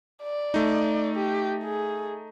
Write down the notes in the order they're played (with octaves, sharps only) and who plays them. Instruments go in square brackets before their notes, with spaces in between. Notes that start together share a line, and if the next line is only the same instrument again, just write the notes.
[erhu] D5
[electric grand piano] A3 D#4
[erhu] G4
G#4